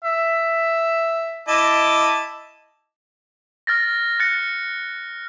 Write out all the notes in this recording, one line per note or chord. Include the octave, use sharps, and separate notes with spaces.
E5
E4 D#5 A5 D6
F6 A6 A#6
F#6 A6 A#6 C#7